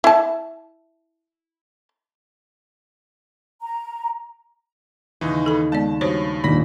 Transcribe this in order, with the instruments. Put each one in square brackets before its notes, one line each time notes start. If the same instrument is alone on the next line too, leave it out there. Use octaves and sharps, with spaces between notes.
[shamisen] E4 A5
[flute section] A#5
[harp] D#2 C#3 [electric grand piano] E3 D#4
[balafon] A4 B5
[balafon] G#3 B3 D5 [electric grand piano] A5
[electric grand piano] G2 [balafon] F#4 C5 C#5
[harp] G#1 A3 [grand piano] D#2 A#2 D4 [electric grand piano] B5 A#6 B6